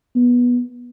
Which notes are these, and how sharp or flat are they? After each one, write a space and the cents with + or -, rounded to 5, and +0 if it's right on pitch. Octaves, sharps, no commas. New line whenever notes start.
B3 -15